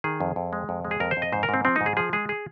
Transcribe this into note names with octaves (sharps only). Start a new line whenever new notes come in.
D#3 G#4
F2
F2
G#3
F2
G#3
G#4
F2 A#4
C5
F2
D#5
G#2 C5
A#4
G#2 C4
F3 C4
G#2 D#4
G#4
F3 G#4
G#3 G#4
G#4